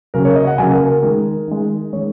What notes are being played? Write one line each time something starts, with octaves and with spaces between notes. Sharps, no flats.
C#3 F#3 A#3 A#4
C#5
D#5
F#5
C#3 F#3 A#3 G#5
A#4
A#4
D#3 G#3
D#3 G#3
D#3 G#3 C#5